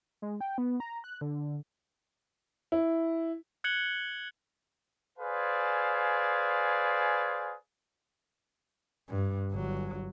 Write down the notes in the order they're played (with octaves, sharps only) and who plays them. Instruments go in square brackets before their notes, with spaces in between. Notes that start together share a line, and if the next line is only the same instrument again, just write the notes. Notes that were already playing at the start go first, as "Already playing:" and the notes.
[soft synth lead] G#3
G5
B3
A#5
F#6
D3
[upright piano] E4
[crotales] F#6 G#6 C#7 F#7 G7
[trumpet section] G#4 B4 C5 D5 F5 G#5
[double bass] G2
G1 F#3